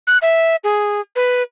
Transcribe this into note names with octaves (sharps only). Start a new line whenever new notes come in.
F#6
E5
G#4
B4